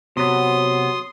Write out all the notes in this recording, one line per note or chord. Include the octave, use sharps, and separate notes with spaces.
C3 F#3 B3 C6 D#6